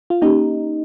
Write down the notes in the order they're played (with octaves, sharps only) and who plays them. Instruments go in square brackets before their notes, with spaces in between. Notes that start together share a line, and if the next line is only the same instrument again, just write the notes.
[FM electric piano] F4
[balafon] A#3 C#4 G4 [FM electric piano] D#4